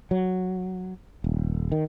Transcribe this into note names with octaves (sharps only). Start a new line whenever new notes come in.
F#3
D#1
D#3